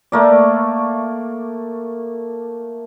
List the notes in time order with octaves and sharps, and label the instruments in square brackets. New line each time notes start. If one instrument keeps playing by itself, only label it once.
[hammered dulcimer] A3 A#3 D5